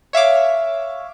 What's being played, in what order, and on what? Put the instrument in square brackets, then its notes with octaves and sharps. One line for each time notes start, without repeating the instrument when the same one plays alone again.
[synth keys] C#5 E5 F5 D6